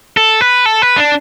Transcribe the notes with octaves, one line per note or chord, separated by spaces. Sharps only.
A4
B4
A4
B4
D4